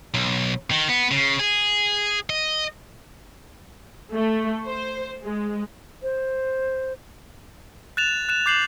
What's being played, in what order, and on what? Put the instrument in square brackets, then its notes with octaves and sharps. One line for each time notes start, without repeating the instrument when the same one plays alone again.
[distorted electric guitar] B1
D#3
B3
C#3
G#4
D#5
[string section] A3
C5
G#3
[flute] C5
[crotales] F#6 A6 E7 F7
F#6 E7
D6 G6 C7 E7 F#7